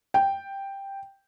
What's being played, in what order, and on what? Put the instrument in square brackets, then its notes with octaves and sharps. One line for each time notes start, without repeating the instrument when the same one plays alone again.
[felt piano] G5